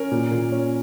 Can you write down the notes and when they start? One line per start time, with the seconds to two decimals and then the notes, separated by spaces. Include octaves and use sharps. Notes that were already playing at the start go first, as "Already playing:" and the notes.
Already playing: C#4 A#4
0.11 A#2
0.31 A#2
0.52 C#4